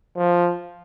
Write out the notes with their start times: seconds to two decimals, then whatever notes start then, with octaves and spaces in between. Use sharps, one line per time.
0.17 F3